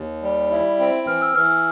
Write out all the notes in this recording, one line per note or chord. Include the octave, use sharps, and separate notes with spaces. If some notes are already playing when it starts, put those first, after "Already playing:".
Already playing: D#2
G3
E4
C4
E3 F6
E6
E3 F6